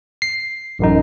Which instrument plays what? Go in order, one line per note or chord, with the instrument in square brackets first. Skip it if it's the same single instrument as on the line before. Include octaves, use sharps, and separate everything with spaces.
[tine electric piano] C7
A1 F#2 D#4